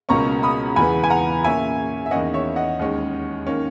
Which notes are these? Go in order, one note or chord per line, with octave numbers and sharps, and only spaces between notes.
C#2 B2 A#3 C#4 A#5 C#6
B5 D#6
E2 C#3 E3 B3 G#5 B5
G#5
F#5 A#5
A#2 A#3 C#4 E5 G#5
E5
E2 D#3 A#3 C#4 D#5 F#5
C#5 E5
D#5 F#5
D#2 D#3 G#3 C#4
D#3 A#3 C#4